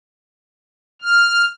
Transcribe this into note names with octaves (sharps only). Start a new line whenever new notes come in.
F6